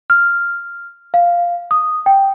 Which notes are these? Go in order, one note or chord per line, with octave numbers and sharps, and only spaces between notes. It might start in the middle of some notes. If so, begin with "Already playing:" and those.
F6
F5
D#6
G5